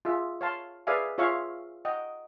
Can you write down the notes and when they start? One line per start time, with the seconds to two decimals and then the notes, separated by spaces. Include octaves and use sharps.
0.05 F4 G#4 E5
0.41 C#5 F5 A5 C6
0.87 G#4 B4 D5 E5 F5 G#5
1.18 F4 G#4 C#5 E5 F5 C#6
1.85 D#5 F#5 G5